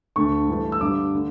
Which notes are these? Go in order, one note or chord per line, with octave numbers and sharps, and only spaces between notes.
D2 D3 A3 C#6
G2 E3 A3
E6
G2 D3 G3 D6
D3 A3